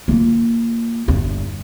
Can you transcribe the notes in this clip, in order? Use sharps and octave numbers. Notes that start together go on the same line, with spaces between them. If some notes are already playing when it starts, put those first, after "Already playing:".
A#3 F4
G1 E2